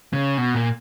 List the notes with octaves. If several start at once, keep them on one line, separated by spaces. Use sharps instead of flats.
C#3
B2
A#2